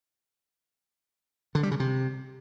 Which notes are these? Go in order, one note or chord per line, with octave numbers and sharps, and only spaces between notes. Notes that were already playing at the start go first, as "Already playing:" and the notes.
D3
G3
C#3
C3